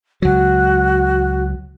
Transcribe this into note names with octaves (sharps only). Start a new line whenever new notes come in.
C#2 F#3 F#4